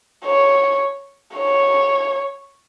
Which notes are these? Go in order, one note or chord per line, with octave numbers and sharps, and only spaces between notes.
C#5
C#5